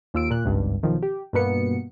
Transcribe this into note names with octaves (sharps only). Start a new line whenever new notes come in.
D#2 F4 E6 D7
A#2 F#6
G#1 C#2 G2
B1 D#3 F3
G4
G2 B2 A#3 B3 C#7